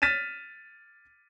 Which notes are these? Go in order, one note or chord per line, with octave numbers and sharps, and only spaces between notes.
F6 A6 B6 D#7 E7